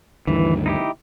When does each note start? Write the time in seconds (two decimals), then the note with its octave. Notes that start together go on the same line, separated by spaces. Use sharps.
0.27 D2 G2 D#3 E3
0.66 D#4 E4 G4